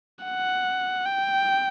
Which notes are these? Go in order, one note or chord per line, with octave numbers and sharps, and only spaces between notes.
F#5
G5